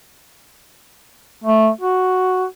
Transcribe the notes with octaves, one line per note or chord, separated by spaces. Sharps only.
A3
F#4